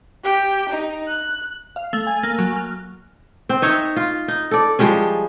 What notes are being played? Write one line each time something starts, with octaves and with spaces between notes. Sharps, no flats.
G4 G5
D#4
F#6
F5
A3
G#5
A#3
F#3
F6
C4
D#4 C#5 E5
F4
D#4
A4 D5
F3 G3 G#3 C#4